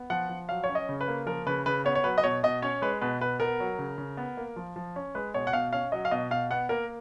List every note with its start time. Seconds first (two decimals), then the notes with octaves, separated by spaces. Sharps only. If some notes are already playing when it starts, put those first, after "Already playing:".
Already playing: B3
0.10 F3 F#5
0.29 F3
0.49 F#3 F5
0.64 C#5
0.69 C#4
0.75 D#5
0.89 C#3
1.01 B4
1.08 A#3
1.26 F3 A#4
1.46 C#3 B4
1.66 C#3 B4
1.85 B3 C#5
1.95 C#5
2.04 F#3 B4
2.18 D#5
2.24 B2 C#5
2.43 B2 D#5
2.62 C#4 C#5
2.82 G#3 B4
3.01 B2 B4
3.20 B2 B4
3.40 B3 A#4
3.60 F#3
3.79 C#3
3.98 C#3
4.17 B3
4.37 A#3
4.56 F3
4.76 F3
4.96 C#4
5.15 G#3 B4
5.34 B2 C#5
5.47 F#5
5.53 B2 F5
5.73 C#4 F5
5.92 F#3 D#5
6.05 F5
6.11 B2 D#5
6.30 B2 F5
6.50 B3 F#5
6.69 A#3 A#4